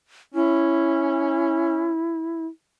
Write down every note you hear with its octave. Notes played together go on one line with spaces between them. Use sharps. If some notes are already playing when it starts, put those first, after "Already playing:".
C#4 E4